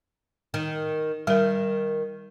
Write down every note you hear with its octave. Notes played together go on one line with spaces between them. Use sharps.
D#3
D#3 G3 A#4